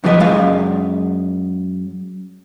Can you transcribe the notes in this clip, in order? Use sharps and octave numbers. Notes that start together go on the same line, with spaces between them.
F#2 E3 F3 F4 B4 D#5
F#2 G#3 F5